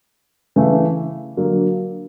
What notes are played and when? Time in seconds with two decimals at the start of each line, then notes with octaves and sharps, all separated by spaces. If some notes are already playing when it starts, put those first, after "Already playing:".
0.56 C#3 E3 A3
1.37 D3 F#3 A#3